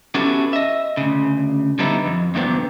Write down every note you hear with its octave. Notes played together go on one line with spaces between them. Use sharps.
B3 C#4 E4 F#4 G4 A4
D#5 E5
D2 C#3
D3 G3 B3 D#4 E4
F2
E2 G2 A#2 D3 B3 C4